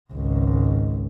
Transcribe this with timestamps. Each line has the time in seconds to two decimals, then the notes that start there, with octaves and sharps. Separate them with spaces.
0.12 G#1 C#2